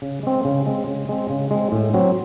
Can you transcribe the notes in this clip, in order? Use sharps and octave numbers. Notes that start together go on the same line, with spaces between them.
C#3
G#3 C4
C#3
G#3 C4
C#3
G#3 C4
C#3
G#3 C4
A2
F#3 C4